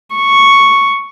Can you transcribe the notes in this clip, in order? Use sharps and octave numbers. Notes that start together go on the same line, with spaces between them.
C#6